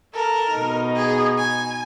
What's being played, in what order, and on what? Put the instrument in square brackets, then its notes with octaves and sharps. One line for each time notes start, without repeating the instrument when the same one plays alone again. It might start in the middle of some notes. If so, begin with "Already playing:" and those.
[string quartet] A4 [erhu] A#4
[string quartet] B2 D#4
[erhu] G#4
G#5